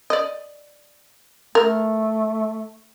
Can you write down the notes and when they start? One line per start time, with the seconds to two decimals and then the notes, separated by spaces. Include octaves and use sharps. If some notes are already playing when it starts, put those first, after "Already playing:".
0.10 D5 D#5
1.55 A3 A#4